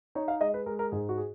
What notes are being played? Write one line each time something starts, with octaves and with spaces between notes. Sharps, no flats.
D#4 C#5
F5
G#3 D#5
B4
G#3 A#4
A#4
G#2 G#4
F#4
G#4